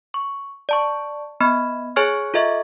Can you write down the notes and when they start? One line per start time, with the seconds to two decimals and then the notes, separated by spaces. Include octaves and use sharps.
0.14 C#6
0.69 D5 A5 C#6
1.41 B3 D#5 B5
1.96 G#4 C#5 G#5 C#6 F6 G#6
2.34 F4 A4 D#5 E5 C#6